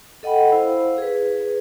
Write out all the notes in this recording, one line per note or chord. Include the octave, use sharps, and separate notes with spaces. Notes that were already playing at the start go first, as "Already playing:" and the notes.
A4 D#5 F#5 G5 B5
E4 C5 F5
G#4 B4